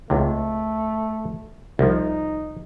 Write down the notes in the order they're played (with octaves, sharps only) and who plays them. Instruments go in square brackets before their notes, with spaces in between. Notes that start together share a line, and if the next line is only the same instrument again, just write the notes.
[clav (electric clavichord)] C#2 C3 [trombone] A3
[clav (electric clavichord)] C2 F3 [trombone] D#4